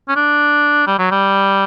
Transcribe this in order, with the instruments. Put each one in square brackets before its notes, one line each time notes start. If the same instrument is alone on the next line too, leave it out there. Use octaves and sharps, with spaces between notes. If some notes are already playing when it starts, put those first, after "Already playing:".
[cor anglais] C#4
D4
G3
F#3
G3